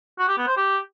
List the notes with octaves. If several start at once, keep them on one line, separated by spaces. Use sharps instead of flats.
F#4
G4
B3
C5
G4